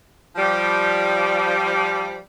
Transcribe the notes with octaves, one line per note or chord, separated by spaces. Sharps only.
F3 G3